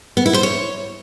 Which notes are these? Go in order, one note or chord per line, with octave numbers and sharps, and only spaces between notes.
B3
E4
C5
C#5